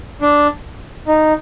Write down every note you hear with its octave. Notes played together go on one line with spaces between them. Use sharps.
D4
D#4